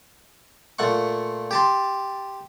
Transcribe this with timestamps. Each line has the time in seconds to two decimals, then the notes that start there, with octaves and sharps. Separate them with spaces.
0.79 A#2 A3 F#5 C#6
1.51 G4 A5 C6